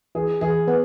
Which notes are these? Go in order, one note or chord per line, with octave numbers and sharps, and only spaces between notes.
E3 G#4
E3 G#4
B3